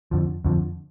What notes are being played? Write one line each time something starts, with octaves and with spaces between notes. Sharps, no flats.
F2 D3 F3
F2 D3 F3